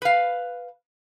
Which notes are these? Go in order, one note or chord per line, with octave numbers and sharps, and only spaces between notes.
B4 F5